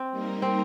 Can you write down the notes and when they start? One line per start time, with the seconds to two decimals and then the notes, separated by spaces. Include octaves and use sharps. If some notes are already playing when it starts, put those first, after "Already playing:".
Already playing: C4
0.11 G3 A#3 D#4 A#4
0.42 C4